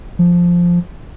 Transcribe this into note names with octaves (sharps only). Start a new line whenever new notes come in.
F3